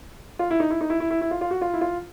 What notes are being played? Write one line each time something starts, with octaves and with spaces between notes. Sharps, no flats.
F4
E4
D#4
E4
D#4
E4
E4
E4
E4
F4
F4
F#4
F4
E4
F4